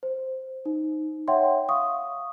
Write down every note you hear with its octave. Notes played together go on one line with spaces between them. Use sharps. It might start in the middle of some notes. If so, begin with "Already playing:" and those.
C5
D#4
C#5 E5 F#5 G5 C6
F5 C#6 D#6